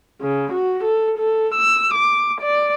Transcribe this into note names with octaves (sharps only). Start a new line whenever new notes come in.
C#3
F#4
A4
A4
E6
D6
D5